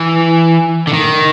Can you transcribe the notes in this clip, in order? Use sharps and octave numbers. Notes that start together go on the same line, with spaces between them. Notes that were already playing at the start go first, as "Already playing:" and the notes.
Already playing: E3
D3
D#3